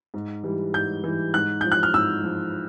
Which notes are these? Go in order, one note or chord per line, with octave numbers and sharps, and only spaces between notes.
G#2
E3 G3
G#2 G6
E3 G3
G#2 F#6
F3 G6
F#6
F6
G#2 E6
F3